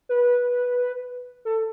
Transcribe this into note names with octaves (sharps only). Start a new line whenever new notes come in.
B4
A4